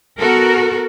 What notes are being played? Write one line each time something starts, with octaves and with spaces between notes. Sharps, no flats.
B3 F#4 A4 A#4